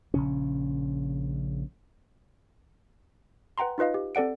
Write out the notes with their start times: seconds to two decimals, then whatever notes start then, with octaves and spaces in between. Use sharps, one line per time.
0.14 A#1 C#3 C#4
3.58 B4 F#5 G5 A#5 C6
3.78 D#4 F4 B4 D#5 F5
3.94 G4
4.15 C4 A4 D5 F#5 D7